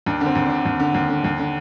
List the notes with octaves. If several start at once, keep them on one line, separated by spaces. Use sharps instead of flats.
D#2 D4
D3
C4
D#2
D3 D4
D#2
D3
D#2
D3
D#2
D3